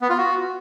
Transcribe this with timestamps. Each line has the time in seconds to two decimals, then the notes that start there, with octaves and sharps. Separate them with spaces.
0.01 B3
0.09 F4
0.18 F#4